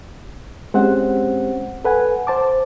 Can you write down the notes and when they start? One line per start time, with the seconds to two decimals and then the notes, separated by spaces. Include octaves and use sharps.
0.74 G#3 C4 C#4 G4 C5 F#5
1.85 A4 B4 F#5 G#5
2.27 C5 A5 D6